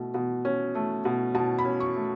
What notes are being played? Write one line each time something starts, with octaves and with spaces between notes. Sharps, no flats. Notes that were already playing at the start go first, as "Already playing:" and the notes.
Already playing: B2 A3
B2
C#4
A3
B2
B2 A5
B5
C#4
C#6
A3